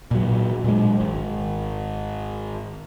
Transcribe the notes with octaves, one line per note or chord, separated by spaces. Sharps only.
A#2 F#3
A#2 G#3
G#1